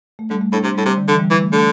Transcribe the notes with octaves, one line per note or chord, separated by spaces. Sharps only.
A3
D3 G3
A3
A2 D4
C3 D4
G3
A2
C3 G3
D3
D3 E3
G3
E3
A3
D3 A3